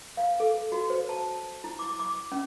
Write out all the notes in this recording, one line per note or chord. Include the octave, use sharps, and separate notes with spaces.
F5
A4
F#4
C5
A5
E4
D6
D6
C#4